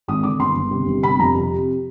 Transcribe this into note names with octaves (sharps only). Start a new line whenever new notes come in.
G#1 D#6
D3 D6
G1 C6
G1
C3
G1
C3 B5
F2 A#5
C3